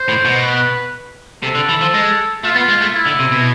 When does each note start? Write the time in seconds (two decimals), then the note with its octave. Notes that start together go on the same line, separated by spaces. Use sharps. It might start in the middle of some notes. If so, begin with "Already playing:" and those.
Already playing: C5
0.08 A2
0.25 B2
0.42 B4
1.43 C3 A4
1.55 D3
1.69 E3
1.81 F3
1.94 G#3
2.44 A3 F4
2.56 B3
2.69 G#3
2.82 A3
2.94 E4
3.07 D3
3.20 C3
3.32 B2